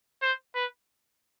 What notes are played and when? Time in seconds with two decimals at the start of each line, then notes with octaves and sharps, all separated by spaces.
0.22 C5
0.55 B4